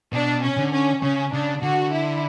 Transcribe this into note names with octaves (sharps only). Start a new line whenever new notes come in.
B2 D4
C#4
D3
C#4
C#3 C#4
C#3 D4
D3 F#4
E4